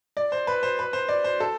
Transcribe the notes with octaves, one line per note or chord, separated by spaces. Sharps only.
D5
C5
B4
C5
B4
C5
D5
C5
A4